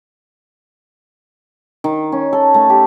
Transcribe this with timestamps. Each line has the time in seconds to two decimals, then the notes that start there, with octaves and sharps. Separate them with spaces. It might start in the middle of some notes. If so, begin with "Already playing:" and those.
1.84 D#3
2.12 C#4
2.33 A4
2.54 A3
2.70 G4